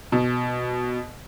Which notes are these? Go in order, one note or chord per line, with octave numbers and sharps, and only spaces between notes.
B2